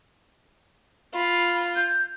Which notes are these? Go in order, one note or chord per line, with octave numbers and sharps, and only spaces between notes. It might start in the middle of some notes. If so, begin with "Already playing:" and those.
F4 B5
G6